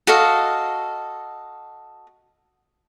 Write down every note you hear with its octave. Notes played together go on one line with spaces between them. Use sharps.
F#4 A4 D#5 F5